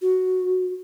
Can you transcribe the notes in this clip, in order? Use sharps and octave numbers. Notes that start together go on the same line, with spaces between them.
F#4